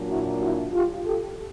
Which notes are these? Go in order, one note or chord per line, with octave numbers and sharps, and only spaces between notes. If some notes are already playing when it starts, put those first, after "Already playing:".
Already playing: A#2 F#3 A#3 D4
E4 F#4
E4 F#4
F4 G4
G4 A4